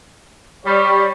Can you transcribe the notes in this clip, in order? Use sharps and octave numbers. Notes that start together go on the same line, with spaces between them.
G3 C#5